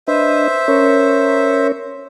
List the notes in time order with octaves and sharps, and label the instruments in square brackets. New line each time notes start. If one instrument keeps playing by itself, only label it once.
[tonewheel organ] D4 B4 D#5 [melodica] C5 E5
[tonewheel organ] C#4 A#4 C#5